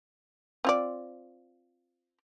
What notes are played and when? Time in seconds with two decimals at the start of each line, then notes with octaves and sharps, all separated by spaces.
0.65 C4 F4 D5